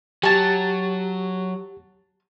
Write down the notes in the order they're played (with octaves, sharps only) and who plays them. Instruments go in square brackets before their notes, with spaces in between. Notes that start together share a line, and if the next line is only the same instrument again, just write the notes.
[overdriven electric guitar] F#3 [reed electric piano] G4 [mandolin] G#5 A5